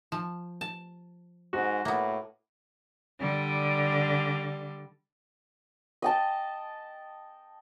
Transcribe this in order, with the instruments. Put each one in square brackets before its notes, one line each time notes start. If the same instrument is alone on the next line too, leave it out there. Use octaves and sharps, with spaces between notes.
[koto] F3
A5
[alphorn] G#2 [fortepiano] F#4
[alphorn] A2 [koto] A#3 B3
[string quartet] D3 G3
[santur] D#5 G5 A5